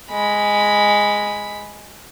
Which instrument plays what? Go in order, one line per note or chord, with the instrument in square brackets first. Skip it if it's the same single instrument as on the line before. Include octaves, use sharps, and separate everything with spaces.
[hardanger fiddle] G#3 B5